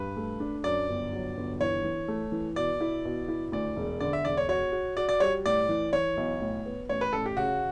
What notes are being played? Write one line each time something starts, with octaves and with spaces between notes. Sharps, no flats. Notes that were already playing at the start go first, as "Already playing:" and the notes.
Already playing: G2 B4
A3
D4
F#2 D5
G1
F#3
G1
E3 C#5
E3
A3
E3
B2 D5
E4
B2
E4
D2 D5
E1
D3 D5
E5
E1 D5
C#5
F#4 C#5
F#4
F#4 D5
D5
G3 C#5
A2 D5
E3
E3 C#5
B1
A2
B3
A1 C#5
B4
A1 A4
G4
C#3 F#4